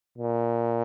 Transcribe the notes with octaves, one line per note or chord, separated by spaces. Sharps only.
A#2